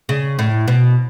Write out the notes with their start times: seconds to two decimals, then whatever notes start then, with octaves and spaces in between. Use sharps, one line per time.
0.09 C#3
0.39 A2
0.68 B2